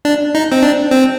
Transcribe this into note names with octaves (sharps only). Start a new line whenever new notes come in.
D4
D#4
C4
D4
C4